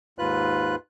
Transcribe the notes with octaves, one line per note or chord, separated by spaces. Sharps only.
D#2 G#2 F4 B4 F#6